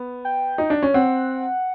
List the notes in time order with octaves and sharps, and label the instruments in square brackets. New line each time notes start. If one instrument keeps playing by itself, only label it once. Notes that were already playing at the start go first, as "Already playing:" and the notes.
Already playing: [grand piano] B3
[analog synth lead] G5
[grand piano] D#4
D4
C#4
[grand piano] C4 [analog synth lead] F#5